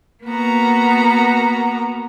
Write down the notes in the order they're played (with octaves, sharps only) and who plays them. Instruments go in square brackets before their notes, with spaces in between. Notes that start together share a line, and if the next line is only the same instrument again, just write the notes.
[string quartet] A#3 B3 F#4 A#5